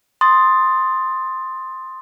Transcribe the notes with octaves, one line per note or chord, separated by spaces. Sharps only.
C6 D#6 A6